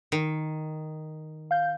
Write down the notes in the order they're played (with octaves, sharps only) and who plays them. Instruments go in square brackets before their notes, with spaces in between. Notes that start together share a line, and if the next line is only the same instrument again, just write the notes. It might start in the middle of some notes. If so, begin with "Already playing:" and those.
[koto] D#3
[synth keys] F5 G6